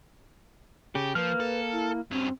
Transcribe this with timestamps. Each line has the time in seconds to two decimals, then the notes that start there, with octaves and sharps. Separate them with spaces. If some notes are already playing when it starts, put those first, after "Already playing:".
0.95 C#3 G4
1.15 F3 A#3 B4 F6
1.40 A4
1.73 E4
2.11 G2 C4 C#4